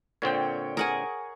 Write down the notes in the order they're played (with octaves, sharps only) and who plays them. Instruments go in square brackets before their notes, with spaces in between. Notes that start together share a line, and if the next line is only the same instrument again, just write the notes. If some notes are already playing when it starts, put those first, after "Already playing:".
[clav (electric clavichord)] A#2 D3 C4 [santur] C#5 G5
[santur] G#4 C#6 [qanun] A#4 F#5 G#5